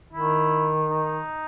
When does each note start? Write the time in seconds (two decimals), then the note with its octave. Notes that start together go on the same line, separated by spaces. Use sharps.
0.13 D#3 E4
0.90 D#4